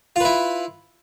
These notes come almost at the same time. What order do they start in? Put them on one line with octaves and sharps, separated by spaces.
F4 B4 E4